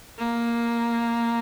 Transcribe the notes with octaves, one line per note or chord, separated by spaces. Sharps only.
A#3